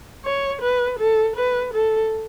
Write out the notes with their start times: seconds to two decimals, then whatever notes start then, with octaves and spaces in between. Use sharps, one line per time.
0.25 C#5
0.62 B4
0.99 A4
1.36 B4
1.74 A4